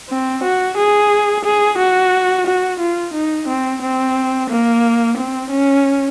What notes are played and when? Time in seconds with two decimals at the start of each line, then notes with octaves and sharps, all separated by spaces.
0.10 C4
0.43 F#4
0.77 G#4
1.45 G#4
1.78 F#4
2.47 F#4
2.80 F4
3.14 D#4
3.48 C4
3.82 C4
4.50 A#3
5.17 C4
5.50 C#4